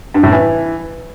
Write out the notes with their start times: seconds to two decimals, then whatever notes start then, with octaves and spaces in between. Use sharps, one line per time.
0.14 G2
0.23 A2
0.32 E3